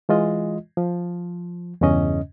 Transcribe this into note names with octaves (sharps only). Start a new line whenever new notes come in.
E3 G#3 F4 D#5
F3
E2 G2 C#3 C#4 D#5